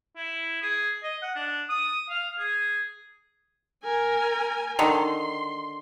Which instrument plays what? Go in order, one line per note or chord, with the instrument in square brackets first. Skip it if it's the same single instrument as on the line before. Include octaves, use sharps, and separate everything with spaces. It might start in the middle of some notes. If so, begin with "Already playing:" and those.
[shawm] E4
G#4
D#5
F#5
D4
D#6
F5
G#4
[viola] A#4 G#5
[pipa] D3 D#3 [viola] C6